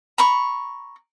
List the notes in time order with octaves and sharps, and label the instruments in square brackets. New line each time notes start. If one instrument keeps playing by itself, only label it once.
[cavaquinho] A#5 B5 C#6